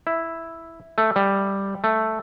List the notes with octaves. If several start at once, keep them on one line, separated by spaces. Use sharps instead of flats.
E4
A3
G3
A3